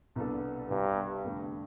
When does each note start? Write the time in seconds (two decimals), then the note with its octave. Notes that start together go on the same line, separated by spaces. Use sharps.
0.16 C2 B2 B3 D4 A4
0.70 C2 G2 C3 G3 B3
1.24 F2 D3 A3 D4